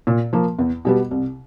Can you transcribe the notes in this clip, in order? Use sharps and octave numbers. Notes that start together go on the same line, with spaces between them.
A#2
F3 A#3
E2
B2 G3 B3
C2